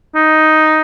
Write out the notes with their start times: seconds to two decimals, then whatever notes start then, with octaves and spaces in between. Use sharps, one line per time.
0.15 D#4